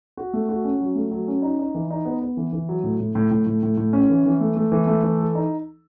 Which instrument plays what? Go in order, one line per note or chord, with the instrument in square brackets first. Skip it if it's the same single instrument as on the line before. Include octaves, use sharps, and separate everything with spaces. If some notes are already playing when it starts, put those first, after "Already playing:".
[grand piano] F#4
A3
F#4
C#4
F#3
A3
F#3
C#4
D#4
D#4
E3
D#4
B3
B3
E3
E3
F#3
A2
A2
A2
A2
A2
A2
A2
C#4
E3
E3
A3
A3
E3
A3
E3
A4
D#4